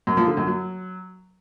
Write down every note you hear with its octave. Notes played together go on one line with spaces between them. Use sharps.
F#2
F3
D3
F#2
F#3